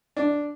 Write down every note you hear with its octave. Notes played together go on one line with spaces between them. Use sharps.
D4